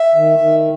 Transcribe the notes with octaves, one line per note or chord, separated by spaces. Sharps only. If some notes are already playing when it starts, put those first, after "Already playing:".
Already playing: E5
D#3
D#3